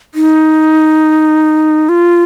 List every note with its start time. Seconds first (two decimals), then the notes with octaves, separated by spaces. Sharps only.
0.15 D#4
1.89 F4